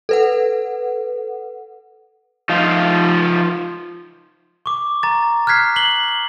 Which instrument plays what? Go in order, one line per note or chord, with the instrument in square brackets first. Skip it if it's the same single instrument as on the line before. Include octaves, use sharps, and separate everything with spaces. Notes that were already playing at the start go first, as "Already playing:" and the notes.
[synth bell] A4 B4 F#5
[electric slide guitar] F3 D#4 F4
[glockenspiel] C#6 D6
A#5 A6
F6 F#6 G#6 B6 C7
F#7 G7